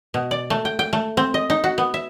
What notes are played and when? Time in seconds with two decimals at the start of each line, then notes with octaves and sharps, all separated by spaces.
0.14 B2
0.31 D5
0.50 A3
0.65 G5
0.79 G5
0.93 A3
1.17 C4
1.34 D#5
1.50 D#4
1.64 F#4
1.78 B3
1.94 E5